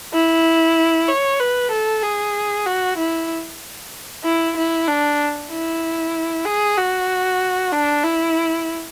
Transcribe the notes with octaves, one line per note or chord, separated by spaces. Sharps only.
E4
C#5
B4
A4
G#4
F#4
E4
E4
E4
D4
E4
G#4
F#4
D4
E4